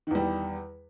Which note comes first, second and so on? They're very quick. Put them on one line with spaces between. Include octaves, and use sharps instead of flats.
D#3 E2 G3